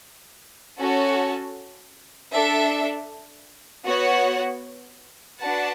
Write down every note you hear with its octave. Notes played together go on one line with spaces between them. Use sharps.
C#4 F#4 A4 C#5
D4 A4 E5
B3 F#4 C#5 F#5
D4 F#4 B4 F#5 A5